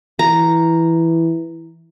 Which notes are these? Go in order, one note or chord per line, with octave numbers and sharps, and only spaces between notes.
E3 A#5